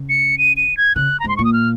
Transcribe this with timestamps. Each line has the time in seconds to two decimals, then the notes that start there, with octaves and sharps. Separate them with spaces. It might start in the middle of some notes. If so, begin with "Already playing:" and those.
Already playing: C#3
0.09 C#7
0.38 D#7
0.57 D#7
0.77 G#6
0.96 C#3 F#6
1.20 A#5
1.24 G#2 C6
1.37 A#2 C#6
1.45 D#6
1.53 F6